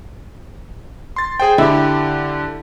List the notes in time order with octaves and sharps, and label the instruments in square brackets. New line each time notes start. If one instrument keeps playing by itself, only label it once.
[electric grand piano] C6 A6
G#4 C5 G5
[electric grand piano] D3 G4 [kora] E4